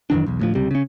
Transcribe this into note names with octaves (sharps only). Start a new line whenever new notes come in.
F#2 D#3 E3 D4
B1 E2
D2 A2 F3
C#2 C3 G3
C#3 C#4